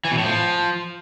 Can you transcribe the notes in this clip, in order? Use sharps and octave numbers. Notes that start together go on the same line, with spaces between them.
E3
B2
A2
F3